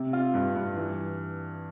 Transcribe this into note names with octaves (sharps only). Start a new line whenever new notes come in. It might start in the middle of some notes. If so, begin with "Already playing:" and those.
Already playing: C3
F4
G2
G2
E3